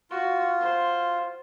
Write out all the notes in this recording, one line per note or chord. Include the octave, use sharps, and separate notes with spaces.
F4 F#4
C5